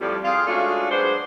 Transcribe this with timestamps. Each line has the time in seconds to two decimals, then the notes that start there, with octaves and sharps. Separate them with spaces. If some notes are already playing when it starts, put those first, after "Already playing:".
0.01 F2 A2 F3 G3
0.25 C4 F4 G#4 F5
0.47 G#3 A3 C#4 D4 F4 F#4
0.91 F#3 G#3 B3 D4 C5